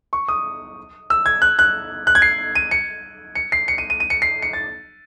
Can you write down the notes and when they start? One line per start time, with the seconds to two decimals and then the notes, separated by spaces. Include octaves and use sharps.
0.13 C#6
0.28 D#6
1.10 E6
1.26 G#6
1.42 F#6
1.59 F#6
2.07 F#6
2.15 G#6
2.22 C7
2.55 D#7
2.71 C#7
3.35 C#7
3.52 C7
3.68 C#7
3.78 D#7
3.90 D#7
4.00 D#7
4.10 C#7
4.22 C7
4.42 C#7
4.53 A6